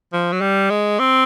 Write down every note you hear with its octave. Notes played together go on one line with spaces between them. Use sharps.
F3
F#3
G3
G#3
C4